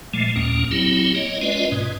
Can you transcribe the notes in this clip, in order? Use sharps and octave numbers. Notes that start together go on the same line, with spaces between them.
A#2 F3 G#3 A3
D#2 A#2 A#3 C#4
F#3 C4 E4 G4
A#3 C#5 D#5
G#3 C#4 F4 B4 D5 D#5
G#2 B2